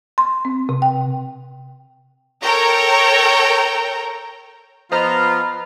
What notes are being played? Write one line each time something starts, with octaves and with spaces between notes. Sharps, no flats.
C6
C4
C3
G5
A4 A#4 C#5 G5 A#5
F3 B3 F4 C5 D#5 A#5 B5 F6